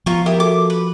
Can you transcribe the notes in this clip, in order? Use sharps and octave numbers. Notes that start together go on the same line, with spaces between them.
F3 B3 F4 A#5 C#6
E4 G4 A#4 D#6
F#4 A4 D6
B4